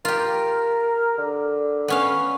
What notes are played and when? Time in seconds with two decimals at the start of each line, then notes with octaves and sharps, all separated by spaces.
0.05 F4 G4 A#4
1.18 D3
1.88 B3 C#4 F5